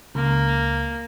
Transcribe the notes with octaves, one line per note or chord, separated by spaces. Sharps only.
C#2 A#3